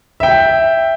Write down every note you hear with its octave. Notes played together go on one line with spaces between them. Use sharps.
E5 G5